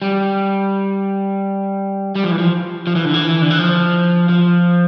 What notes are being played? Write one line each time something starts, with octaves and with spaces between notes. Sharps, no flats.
G3
G3
F3
E3
F3
F3
E3
D3
E3
D3
E3
F3
F3